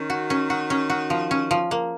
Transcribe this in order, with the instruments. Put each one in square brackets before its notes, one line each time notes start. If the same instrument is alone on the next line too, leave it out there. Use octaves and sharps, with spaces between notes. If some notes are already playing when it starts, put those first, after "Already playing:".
Already playing: [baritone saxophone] D#3 [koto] C#4
[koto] F#4
C#4
F#4
C#4
F#4
F3
C#4
F3
A#3